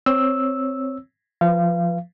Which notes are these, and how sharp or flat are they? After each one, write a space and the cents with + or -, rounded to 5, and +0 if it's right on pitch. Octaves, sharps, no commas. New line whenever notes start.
C4 +0 C#5 +0 E6 -5
F3 -5 B4 +0 F5 -30